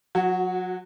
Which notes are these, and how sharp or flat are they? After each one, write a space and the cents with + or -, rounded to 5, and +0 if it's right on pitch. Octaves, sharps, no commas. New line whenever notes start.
F#3 -30 F#4 +0